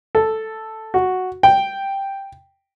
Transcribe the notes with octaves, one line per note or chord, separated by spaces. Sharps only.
A4
F#4
G5